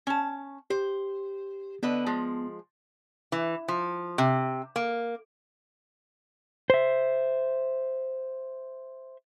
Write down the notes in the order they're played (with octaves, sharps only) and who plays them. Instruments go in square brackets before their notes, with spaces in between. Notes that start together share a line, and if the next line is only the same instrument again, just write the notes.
[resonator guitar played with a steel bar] C#4 A5
[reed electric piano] G4 [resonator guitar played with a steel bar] C5
[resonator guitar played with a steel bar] D3 B4 D#5 [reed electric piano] B3
[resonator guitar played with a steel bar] F3 G#3
E3
F3
C3
A#3
[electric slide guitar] C5 E5